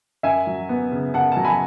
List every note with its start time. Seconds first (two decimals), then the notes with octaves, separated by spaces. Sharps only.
0.23 F#2 E5 G#5
0.47 F#3
0.69 B3
0.92 C#3
1.14 F#2 F#5 A5
1.32 F#3 A5
1.45 G#5 B5